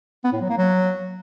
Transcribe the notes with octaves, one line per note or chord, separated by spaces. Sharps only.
B3
A2
F#3
A#3
F#3